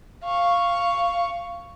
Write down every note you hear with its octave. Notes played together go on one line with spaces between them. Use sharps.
F5 C#6